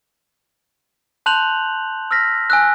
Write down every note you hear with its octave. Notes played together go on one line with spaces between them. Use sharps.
A5 C6 F#6 G6 F7 F#7
E6 F6 A#6 B6
G#5 E6 F#6